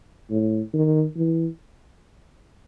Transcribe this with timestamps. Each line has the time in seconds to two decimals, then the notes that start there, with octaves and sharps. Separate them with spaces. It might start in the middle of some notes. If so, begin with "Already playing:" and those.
0.31 A2
0.74 D#3
1.17 E3